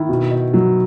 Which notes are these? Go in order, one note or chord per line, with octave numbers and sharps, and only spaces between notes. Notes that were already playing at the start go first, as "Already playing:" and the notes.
Already playing: D#3 E4
B2
D#4
F#3